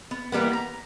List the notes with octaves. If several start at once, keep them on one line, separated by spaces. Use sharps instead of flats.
B3
E3 G3 A#3 B3
A#5